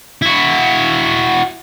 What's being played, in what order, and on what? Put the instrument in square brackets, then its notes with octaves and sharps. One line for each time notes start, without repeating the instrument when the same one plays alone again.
[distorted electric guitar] E4 F#4